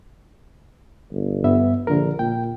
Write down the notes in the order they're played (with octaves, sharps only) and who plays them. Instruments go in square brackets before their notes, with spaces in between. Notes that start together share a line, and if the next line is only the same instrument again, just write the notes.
[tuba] G1
[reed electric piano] G2 B3 E5
[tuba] A#1 [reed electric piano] D3 A#4
[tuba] A#2 [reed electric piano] G5